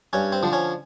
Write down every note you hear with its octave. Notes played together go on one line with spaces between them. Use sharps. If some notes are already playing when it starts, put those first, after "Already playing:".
G2 C#4
C4
D3 F3
C#4